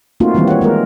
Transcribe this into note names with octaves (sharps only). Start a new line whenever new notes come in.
A3 A#3 C4 D#4 F4 F#4
D#3 E3 G3 A#3 C4
C#5 F#5
G#3 A#3 F4 A#4